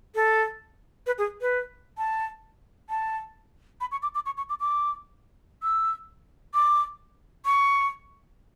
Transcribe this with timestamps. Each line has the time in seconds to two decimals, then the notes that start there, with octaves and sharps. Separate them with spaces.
0.15 A4
1.07 B4
1.18 G#4
1.41 B4
1.98 A5
2.89 A5
3.81 B5
3.92 C#6
4.03 D6
4.15 D6
4.26 C#6
4.37 C#6
4.50 D6
4.60 D6
5.63 E6
6.54 D6
7.45 C#6